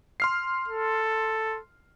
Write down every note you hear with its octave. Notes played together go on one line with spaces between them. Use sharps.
C6 F6 C7
A4